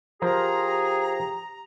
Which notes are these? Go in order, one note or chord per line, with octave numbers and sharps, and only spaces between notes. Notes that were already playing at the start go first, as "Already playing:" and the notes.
F3 G4 G#4 A#4 C5 A#5